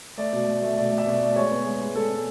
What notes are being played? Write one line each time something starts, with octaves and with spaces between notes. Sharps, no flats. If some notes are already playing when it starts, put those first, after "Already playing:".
A3 D5
B2
A3
A3
B2 D5
A3
E5
B2 D5
A3
G#3 C#5
B3
G#3
G#3
G#3 A4
B3